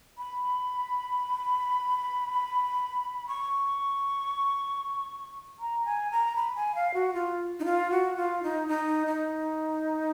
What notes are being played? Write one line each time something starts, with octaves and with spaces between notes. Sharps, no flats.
B5
C#6
A#5
G#5
A#5
B5
G#5
F5
F#4
F4
D#4
F4
F#4
F4
D#4
D#4
D#4